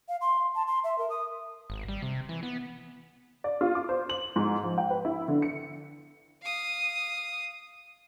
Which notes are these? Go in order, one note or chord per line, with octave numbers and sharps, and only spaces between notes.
F5
C6
A5
C6
E5
A#4
D#6
G#1
G3
C3
E3
B3
D5
F4
D6
C5
F#7
G#2
F3
G5
B4
E4
D3
C#7
F5 D#6